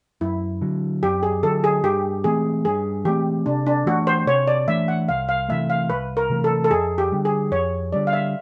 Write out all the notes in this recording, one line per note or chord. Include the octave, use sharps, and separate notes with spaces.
F#2 E4
D3 F#3
F#2 G4
G#4
D3 F#3 A4
G#4
G2 G4
E3 A3 C4 G#4
G2 G#4
E3 A3 C4 G4
C3 D4
D4
E3 A3 D4 F#4
C5
C3 C#5
D5
E3 A3 D4 E5
F#5
C2 F5
F5
C3 E3 A3 E5
F5
C2 B4
A#4
C3 E3 A3
A4
A4
F2 G#4
G4
D3 G3
G#4
F2 C#5
D3 G3 D5
F5
E5